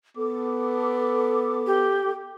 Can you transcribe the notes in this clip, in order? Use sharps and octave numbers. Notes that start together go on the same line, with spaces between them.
B3 A4 D6
G4